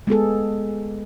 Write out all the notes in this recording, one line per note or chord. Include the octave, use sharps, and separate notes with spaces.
G#3 B3 G#4 A4